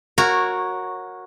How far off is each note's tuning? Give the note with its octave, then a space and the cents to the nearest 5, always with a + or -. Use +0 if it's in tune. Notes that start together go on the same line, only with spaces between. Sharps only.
F#4 -10 A#4 +0 C#5 -15